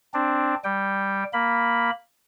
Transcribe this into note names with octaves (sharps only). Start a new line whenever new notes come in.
C4 D4
G3 G5
A#3 B5